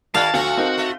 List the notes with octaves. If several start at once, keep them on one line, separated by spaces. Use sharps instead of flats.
D#3 G#3 F#4 D5 F5 A5
D2 F3 F4 F#4 A4
C4 D#4 A#4
A3